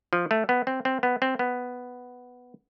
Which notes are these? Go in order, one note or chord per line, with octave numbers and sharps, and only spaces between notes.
F3
A3
B3
C4
C4
B3
C4
B3